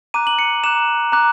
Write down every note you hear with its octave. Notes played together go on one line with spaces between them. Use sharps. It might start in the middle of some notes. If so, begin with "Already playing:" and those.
A#5 D6 F#6 D#7
F#7
C#7
A#5 D6 F#6 E7
A#5 D6 F#6